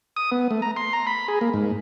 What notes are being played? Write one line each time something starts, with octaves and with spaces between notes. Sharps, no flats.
D#6
B3
A3
A#5
C6
A#5
B5
G#4
A#3
G#2